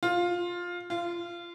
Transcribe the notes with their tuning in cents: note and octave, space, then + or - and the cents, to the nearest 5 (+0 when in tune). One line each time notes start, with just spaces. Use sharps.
F4 +10
F4 -20